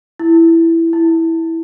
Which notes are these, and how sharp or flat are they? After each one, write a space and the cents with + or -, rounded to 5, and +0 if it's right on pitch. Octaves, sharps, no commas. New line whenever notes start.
E4 +5
E4 -10